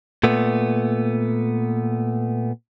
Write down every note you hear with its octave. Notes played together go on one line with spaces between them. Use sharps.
A#2 A3 B3